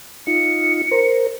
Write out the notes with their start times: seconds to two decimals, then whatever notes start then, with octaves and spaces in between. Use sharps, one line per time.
0.27 D#4 F4 C#7
0.91 A#4 C5